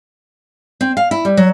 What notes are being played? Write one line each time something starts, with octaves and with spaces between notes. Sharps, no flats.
C4
F5
E4
G3
F#3